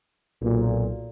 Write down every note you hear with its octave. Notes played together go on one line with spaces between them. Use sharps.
B1 A#2